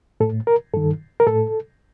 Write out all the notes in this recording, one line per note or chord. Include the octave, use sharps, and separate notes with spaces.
A2 A4
A#4
G2 D#3 A4
A#4
A2 A4